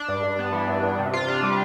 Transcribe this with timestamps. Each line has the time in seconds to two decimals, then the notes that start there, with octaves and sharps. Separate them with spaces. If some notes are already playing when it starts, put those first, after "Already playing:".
Already playing: D4
0.08 G2
0.23 G2
0.39 B3
0.53 E3
0.69 G2
0.83 G2
0.99 C3
1.13 F4
1.28 D4
1.43 G3